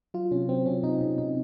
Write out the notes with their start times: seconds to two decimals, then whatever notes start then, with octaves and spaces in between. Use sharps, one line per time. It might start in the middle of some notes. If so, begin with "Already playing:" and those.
0.14 F#3 F4
0.31 C3 C#4
0.49 F#3 C4
0.66 C3 C#4
0.83 C3 D#4
1.01 C3
1.18 C3 D#4